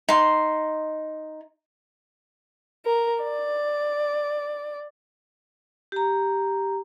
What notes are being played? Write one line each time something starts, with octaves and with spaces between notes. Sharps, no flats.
D#4 C6
A#4
D5
G4 A#5